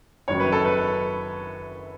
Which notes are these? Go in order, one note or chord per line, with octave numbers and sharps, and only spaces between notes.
F#1 F#2 D#3 F#3 C#5
B4
A4
B4